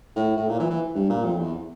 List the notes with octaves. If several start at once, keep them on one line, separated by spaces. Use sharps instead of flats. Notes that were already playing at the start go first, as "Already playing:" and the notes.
A2
A2
A#2
E3
E3
G2
A#2
F2
E2